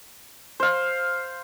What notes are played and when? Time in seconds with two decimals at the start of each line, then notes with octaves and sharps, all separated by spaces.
0.60 C5 F5